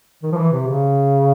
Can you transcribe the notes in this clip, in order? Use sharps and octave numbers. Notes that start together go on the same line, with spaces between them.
D#3
F3
E3
C3
C#3